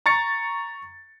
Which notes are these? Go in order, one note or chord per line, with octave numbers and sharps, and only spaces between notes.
A#5 C#6 A6 C#7